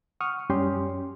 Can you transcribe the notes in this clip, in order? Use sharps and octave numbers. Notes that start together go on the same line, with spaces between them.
F#5 C#6 D#6 F6
F#2 G3 C#4 G4 C6